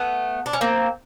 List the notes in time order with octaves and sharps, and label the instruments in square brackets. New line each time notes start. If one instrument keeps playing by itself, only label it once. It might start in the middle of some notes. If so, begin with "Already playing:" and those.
Already playing: [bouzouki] A3 B3
D4
C#4
A#3 C4